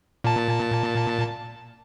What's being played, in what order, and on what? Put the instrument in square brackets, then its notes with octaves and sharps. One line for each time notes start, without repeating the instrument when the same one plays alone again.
[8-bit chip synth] A#2 A5